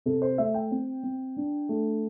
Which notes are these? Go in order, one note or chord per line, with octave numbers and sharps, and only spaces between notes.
C3 A4
C5
A3 E5
G5
C4
C4
D4
A3